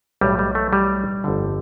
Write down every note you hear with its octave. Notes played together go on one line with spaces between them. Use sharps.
B1 A2 E3 G3
G3
A3
G3
G1 F2 D3